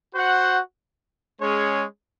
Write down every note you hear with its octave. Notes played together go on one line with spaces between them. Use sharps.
F#4 C5 F#5
G#3 C#4 G#4 C#5